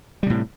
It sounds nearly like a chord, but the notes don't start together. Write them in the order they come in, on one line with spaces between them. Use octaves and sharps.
G3 C3 A2